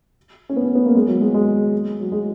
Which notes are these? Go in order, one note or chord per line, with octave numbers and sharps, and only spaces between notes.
C#4
B3
C#4
B3
A#3
G#3
F#3
G#3
G#3
F#3
G#3